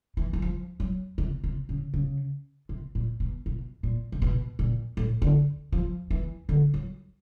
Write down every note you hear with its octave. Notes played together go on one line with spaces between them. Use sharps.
E3
E3
F3
F#3
C3
C3
C#3
C#3
C3
A#2
B2
B2
A#2
C3
B2
A#2
A2
D3
F3
E3
D3
F#3